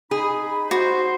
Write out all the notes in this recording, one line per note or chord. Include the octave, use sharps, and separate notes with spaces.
D#4 G#4 B5
F#4 C5